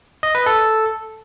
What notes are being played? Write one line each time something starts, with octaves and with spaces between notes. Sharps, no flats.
D#5
B4
A4